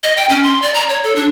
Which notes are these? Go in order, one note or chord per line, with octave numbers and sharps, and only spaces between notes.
D#5
G5
C#4
C6
D5
A#5
C#5
A4
D4